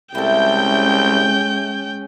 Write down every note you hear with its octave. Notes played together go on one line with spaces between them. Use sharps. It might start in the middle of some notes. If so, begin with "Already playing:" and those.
C2 G#3 C#4 E4 A4 G5 G6